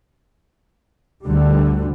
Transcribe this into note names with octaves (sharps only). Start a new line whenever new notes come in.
D2 D3 G3